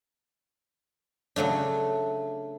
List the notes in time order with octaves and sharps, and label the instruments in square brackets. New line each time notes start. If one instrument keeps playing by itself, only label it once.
[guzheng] C#3 F#3 A3 D4